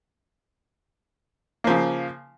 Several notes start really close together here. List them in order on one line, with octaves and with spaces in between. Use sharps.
A#3 F3 C#3